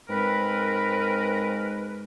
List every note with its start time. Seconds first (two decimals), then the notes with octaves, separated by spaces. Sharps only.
0.09 G#2 C4 A#4 B4